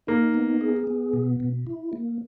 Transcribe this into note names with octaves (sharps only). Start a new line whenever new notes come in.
A#3 D#4
B3
G#4
B3
B2
B2
E4
A#3